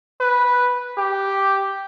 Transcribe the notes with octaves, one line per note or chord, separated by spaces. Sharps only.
B4
G4